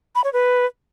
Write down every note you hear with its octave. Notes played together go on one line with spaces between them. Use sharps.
B5
C#5
B4